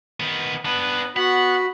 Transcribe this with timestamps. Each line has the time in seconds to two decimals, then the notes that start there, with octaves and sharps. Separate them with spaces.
0.20 D#3 B3
0.65 B3 D4 B4
1.17 B3 F#4 F#5 B5